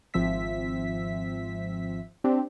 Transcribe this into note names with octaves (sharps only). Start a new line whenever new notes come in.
G#1 F3 C4 E5 B6
C4 D4 G4